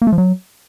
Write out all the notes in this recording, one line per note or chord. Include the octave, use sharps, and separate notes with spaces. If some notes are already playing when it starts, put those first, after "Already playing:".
A#3
A3
F3
F#3